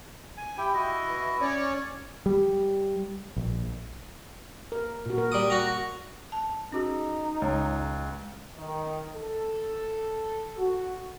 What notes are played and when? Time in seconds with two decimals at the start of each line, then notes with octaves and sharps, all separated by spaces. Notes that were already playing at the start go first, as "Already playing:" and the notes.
0.37 G#5
0.58 E4 G4 G5
0.74 E4 F#4 D#5
1.07 E3
1.41 C#4 C#5 D5
2.26 G3
3.36 A#1
4.72 A#4
5.06 A#2 F#4
5.18 A#4
5.32 G3 D6 D#6
5.50 F#4 A#5
6.32 A5
6.72 C#4 D#4 F#4 G#4
7.42 C#2 C#5
8.56 D#3
9.16 A4
10.57 F#4